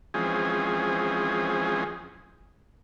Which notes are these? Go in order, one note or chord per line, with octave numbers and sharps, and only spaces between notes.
E3 F3 G#3 C4 C#4 G#4